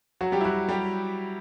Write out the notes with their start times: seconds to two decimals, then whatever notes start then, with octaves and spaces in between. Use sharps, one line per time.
0.21 F#3 F#4
0.32 G3 G4
0.41 E4
0.45 F#3 F#4
0.68 G3 G4